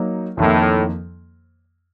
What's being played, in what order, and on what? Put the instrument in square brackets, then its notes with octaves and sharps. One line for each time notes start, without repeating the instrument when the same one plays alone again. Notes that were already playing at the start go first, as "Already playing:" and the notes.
Already playing: [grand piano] F#3 A#3 D#4
[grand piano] F2 D#3 A#3 [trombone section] A2